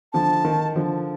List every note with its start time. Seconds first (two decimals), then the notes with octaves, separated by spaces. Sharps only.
0.13 D3 F3 A5
0.45 D#3
0.76 D3 F3